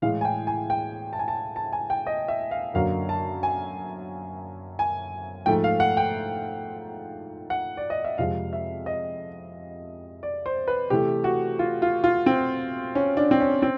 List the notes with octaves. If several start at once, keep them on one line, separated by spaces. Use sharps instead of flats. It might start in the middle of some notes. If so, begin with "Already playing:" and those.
A2 E3 G#3 F5
G#5
G5
G#5
G5
A5
G#5
A5
A5
G#5
G5
D#5
E5
F5
F#2 D3 F#3 A#3 F5
A5
G#5
G#5
G#2 F3 A3 G5
F5
F#5
G5
F#5
D5
D#5
E5
F2 C3 F3 G#3 F5
E5
D#5
D5
C5
B4
C3 E3 A3 G4
F#4
F4
F4
F4
C4
C#4
D4
C4
C#4
C4